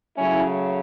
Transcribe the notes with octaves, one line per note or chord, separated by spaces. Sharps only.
C#3 F#3 A3 C#4 E4